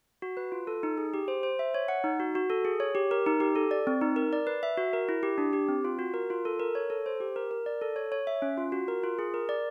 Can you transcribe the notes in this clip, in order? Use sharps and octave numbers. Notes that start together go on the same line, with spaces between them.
F#4
B4
F4
A4
D#4
G#4
G4
C5
C5
E5
C#5
F#5
D#4
F#4
F#4
A4
G#4
C#5
G4
A#4
D#4
G4
A4
D5
C4
D#4
A#4
D5
B4
E5
F#4
A#4
E4
G4
D4
G4
C4
F4
F#4
A#4
F4
A4
A#4
C#5
A4
C5
G4
A#4
A#4
D5
A4
C#5
C#5
E5
C#4
F4
F#4
A#4
F4
G#4
A#4
D5